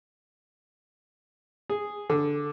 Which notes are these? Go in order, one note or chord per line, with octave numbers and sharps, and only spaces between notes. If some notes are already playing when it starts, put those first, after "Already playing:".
G#4
D3